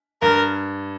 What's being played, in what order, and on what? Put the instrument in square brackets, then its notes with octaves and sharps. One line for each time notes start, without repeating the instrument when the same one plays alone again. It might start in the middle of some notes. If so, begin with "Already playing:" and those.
[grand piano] G2 [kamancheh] A#4